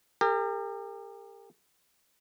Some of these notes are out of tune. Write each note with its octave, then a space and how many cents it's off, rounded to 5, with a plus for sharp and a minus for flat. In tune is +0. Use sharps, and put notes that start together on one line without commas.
G4 +35 A#4 -35